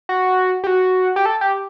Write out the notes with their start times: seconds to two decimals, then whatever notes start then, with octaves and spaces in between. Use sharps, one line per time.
0.09 F#4
0.64 G4
0.67 F#4
1.16 G4
1.26 A4
1.41 G4